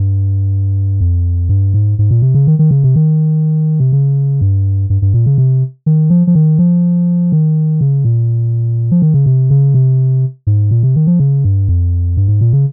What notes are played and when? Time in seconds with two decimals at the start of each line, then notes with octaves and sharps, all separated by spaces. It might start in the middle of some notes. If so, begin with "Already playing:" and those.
Already playing: G2
1.01 F2
1.49 G2
1.74 G#2
1.99 G#2
2.11 A#2
2.22 C3
2.34 C#3
2.47 D#3
2.59 D#3
2.71 C#3
2.84 C3
2.96 D#3
3.80 C3
3.92 C#3
4.41 G2
4.90 G2
5.02 G2
5.14 A#2
5.26 C#3
5.38 C3
5.86 D#3
6.10 F3
6.27 F3
6.35 D#3
6.59 F3
7.32 D#3
7.81 C#3
8.05 A#2
8.91 F3
9.02 D#3
9.14 C#3
9.26 C3
9.50 C#3
9.74 C3
10.47 G#2
10.71 A#2
10.83 C3
10.96 D#3
11.07 F3
11.19 C#3
11.45 G2
11.69 F2
12.17 G2
12.28 G#2
12.41 A#2
12.53 C#3